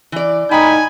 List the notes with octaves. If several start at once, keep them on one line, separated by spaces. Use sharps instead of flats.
E3 D5
A2 D#4 G5 G#5 B5